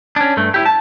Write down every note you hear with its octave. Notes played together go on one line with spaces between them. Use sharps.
C#4 D4
G2 A3
E4 G4
A5